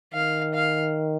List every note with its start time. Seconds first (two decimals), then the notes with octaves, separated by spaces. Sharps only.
0.14 D#3 F5
0.54 F5